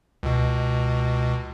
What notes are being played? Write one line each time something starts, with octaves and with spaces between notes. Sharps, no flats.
C#2 B2